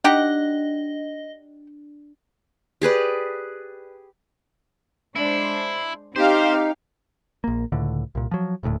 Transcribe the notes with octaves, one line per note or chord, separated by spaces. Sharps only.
D4 D#4 G4 D#5 F#5
G4 G#4 B4 D5
G#3 D4 E4 C5
C4 D#4 G4 C5 F5
A#1 A#3
C#2 A2 D3
C2 A#2
F3 F#3
D#1 A1 D2 A2